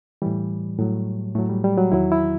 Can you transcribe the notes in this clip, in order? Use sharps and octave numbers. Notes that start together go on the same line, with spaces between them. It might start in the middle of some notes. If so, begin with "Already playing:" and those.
A2 E3 G3
A2 F#3
A2 F#3 A3
G3
G3
F#3
E2 D#3 F#3 E4
E4